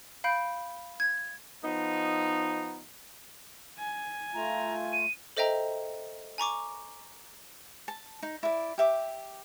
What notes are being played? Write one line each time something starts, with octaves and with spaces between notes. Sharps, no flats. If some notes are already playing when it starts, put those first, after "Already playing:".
F5 B5 G6 D7
G#6
F3 B3 D#4
G#5
A3 F4 A#5
D#7
A4 C5 D#5 E5 G5 A#5
G#5 A#5 C#6 D6
A5
D#4
E4 D5
G4 E5 D6